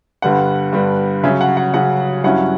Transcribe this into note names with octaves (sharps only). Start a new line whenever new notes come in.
G2 D3 G3 B3 F#5
G2 D3 G3 B3
C#3 F#3 C#4 E5
F#5
F#5
C#3 F#3 C#4 F#5
G2 F#3 C#4 E4 F#5